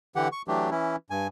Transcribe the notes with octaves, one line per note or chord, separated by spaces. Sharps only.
D3 E3 G4 F#5
C#6
E3 F#3 A3 D4 G4
E3 C#4 E4
G2 G#5